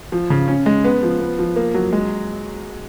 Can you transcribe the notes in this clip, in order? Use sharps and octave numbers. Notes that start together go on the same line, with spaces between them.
F3
C#3
C#4
G#3
B3
F3
B3
F3
A#3
F#3
G#3